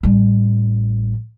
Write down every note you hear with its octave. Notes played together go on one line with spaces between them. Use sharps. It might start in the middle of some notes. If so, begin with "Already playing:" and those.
A1 G3